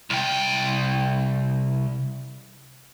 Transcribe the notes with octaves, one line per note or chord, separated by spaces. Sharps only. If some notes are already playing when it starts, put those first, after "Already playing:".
C2 G5